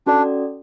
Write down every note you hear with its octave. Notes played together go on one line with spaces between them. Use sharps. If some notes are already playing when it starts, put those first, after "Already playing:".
C#4 D4 F#4 A4 D5